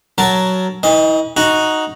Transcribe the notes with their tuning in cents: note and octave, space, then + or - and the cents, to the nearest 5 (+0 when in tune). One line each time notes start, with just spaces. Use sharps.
F#3 +10 A#4 +0 A5 +0
E3 -40 D#5 +10
D#4 +5 F#4 +0